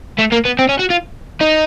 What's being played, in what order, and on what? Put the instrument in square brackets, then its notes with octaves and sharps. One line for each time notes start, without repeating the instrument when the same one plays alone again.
[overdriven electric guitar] A3
A#3
B3
C4
C#4
F#4
F4
D#4